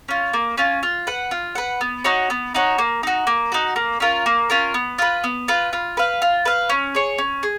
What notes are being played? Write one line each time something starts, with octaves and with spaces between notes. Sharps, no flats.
C#4 F4
A#3
C#4 F4
F4
B4 F#5
F4
B4 F#5
B3
D#4 F#4 C#5
B3
D#4 F#4 C#5
A#3
D#4 F#4
A#3
D#4 F#4
A#3
C#4 F4 A#4
A#3
C#4 F4 A#4
B3
F4 B4
B3
F4 B4
F4
B4 F5
F4
B4 F5
C#4
G#4 C#5
C#4
G#4